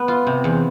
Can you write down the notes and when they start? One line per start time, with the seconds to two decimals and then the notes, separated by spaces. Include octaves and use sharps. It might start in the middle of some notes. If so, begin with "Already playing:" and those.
Already playing: B3
0.08 F4
0.27 C3
0.44 E2